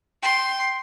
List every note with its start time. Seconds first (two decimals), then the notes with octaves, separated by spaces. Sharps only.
0.23 G5 C6